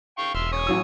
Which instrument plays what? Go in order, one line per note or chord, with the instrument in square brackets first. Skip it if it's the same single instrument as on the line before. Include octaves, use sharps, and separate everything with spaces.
[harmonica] F5 G5 C#6
[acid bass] E1 [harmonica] E5 C6 F6
[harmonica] C#5 G#5 D#6
[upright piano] A1 F#3 E6